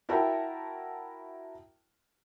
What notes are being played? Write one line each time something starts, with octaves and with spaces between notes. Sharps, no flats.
E4 F#4 A#4 E5 G5 A5